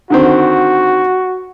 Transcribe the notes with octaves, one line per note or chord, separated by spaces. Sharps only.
D3 D#3 C4 F#4